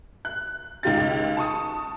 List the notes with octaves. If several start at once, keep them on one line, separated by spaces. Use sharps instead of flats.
F#6
C#2 D#3 F4 G4 F6 A6
A5 C#6 D#6